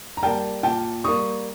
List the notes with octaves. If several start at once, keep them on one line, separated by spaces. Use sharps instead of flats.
A#5
G3 A#3 G5 A5
A#2 G5 A5
G3 A#3 C#6 D#6